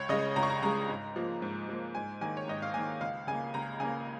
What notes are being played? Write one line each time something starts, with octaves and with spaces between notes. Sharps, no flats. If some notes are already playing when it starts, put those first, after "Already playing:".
Already playing: C#2 C#5
C#3 G#3 D#5
C#2 A#5
C#6
A#5
C#3 G#3 A#5
G#2
F3 A#3
G#2
F3 A#3
G#2 G#5
D#3 A#3 G#5
C#5
G#2 D#5
F5
D#3 A#3 G#5
C#2 F5
C#3 A#3 G#5
C#2 A#5
C#3 A#3 G#5